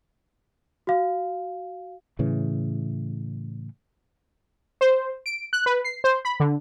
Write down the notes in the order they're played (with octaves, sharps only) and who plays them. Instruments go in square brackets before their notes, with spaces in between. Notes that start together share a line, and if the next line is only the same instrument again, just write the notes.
[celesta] F#4 F5
[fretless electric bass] A2 C#3 E3
[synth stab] C5
D7
F#6
B4
C7
C5
B5
D3